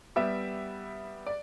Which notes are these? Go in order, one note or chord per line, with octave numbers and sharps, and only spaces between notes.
G3 B3 G4 E5
D5